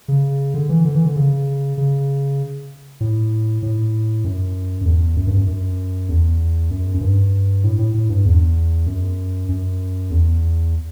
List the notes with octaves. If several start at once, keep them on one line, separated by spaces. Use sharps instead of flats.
C#3
D3
E3
D3
E3
D3
C#3
C#3
A2
A2
F#2
F#2
E2
F#2
G2
F#2
F#2
E2
F#2
F#2
G2
A2
A2
A2
G2
E2
F#2
F#2
E2